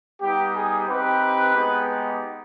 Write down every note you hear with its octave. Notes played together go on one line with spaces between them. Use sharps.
G3 B3 D#4 G4
G#4
C4 D#4 G4 B4
G#3 B3 D#4 G4